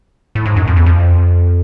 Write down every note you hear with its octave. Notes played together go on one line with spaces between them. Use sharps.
A2
G#2
F#2
F2
E2
F2